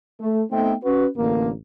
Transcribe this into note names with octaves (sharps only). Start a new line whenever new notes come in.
A3
A3 B3 C4 D#4 E5 G5
C#4 F#4 B4
A1 D3 A#3